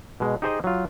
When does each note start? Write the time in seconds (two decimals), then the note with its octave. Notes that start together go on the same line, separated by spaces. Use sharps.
0.20 B2 G#3
0.42 D#4 G4 G#4 C5 D#5 G#5
0.64 F#3 F4